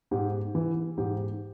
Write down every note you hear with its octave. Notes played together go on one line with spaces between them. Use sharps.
G#2 G4
E3
G#2 G4